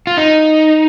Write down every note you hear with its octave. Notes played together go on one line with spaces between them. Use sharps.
F4
D#4